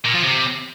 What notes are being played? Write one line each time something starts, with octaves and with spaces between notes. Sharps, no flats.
A#2
F3
C3